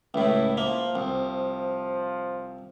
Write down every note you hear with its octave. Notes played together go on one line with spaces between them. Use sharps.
C#2 A2 E4
F3 A#3
C2